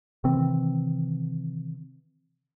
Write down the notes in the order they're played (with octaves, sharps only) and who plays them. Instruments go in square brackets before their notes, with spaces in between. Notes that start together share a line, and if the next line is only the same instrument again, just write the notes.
[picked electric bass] C3 D#3 E3 C4